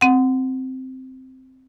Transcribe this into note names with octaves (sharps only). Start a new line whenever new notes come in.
C4 F#5